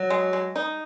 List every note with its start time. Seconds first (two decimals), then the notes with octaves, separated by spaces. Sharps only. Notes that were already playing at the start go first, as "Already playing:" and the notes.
Already playing: F#3
0.10 G#3
0.33 G#3
0.56 D#4